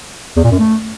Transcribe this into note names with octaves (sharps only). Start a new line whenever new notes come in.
E2
A#2
F#2
A3